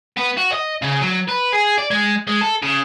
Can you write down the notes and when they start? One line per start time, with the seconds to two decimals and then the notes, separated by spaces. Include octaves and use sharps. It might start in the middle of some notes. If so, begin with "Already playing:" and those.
0.17 B3
0.38 F#4
0.53 D#5
0.82 C#3
1.01 F#3
1.28 B4
1.52 G#4
1.78 D5
1.91 G#3
2.28 G#3
2.41 A4
2.63 C#3